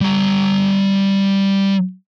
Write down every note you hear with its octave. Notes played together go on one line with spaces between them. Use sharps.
G3 A#5